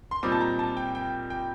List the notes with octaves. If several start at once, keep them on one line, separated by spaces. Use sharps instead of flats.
C6
A#2 G3 C4 D#4 D6
A5
A#5
A5
G5
G5
G5